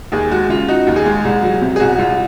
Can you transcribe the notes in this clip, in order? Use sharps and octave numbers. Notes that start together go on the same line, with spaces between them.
D#2 G#4
G#3 F#4
C#3 F4
D#4 F#4
D#2
G#4
G#3
C2
F#3
C3
G#4
C2 F#4
C2 F4